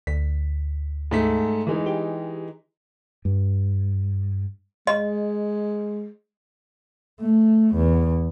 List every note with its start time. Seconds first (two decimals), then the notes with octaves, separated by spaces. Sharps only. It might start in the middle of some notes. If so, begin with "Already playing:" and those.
0.07 D2 B6
1.11 G#2 A3 B6
1.67 E3 G#3 D#4
1.86 G4
3.25 G2
4.87 G#3 D#5
7.21 A3
7.76 E2